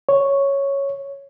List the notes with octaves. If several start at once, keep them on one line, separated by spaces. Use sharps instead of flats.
C#5